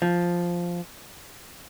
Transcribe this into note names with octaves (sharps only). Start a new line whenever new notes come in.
F3